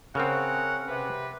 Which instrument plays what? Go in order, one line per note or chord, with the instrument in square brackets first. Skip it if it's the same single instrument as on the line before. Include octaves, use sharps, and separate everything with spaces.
[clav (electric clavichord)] C#3 C4 [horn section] C#4 A#4 F#5
[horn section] C3 B4